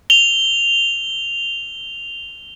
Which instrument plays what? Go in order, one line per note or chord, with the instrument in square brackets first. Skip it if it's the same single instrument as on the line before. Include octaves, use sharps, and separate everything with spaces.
[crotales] F7 G7